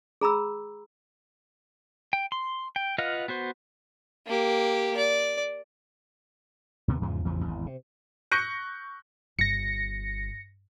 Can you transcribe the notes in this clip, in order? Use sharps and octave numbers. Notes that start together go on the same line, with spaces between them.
G#4 A#5 B5 E6
G5
C6
G5
F4 B4 D#5 F5 F#5
B3 F#4 C5
A#3 G4
D5
D#2 C3 D#3 B3
E2 G#2 C#3 F3
A1 E2 C#3 F3
G#1 E2
C3
C#6 F#6 G6 A#6 C#7
G1 A#6 C#7